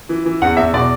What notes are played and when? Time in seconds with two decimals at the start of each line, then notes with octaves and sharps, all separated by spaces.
0.09 E3
0.26 E3
0.42 E2 F#5
0.57 E2 E5
0.73 B2 D5